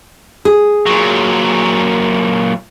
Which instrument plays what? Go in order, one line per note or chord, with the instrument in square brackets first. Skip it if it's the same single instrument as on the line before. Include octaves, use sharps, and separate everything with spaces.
[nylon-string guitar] G#4
[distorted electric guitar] A#2 F#3